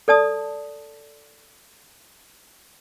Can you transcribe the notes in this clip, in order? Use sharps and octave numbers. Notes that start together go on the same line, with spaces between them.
A4 D5 A5 D#6